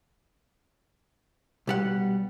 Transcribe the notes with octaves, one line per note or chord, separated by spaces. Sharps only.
B1 G3 F#5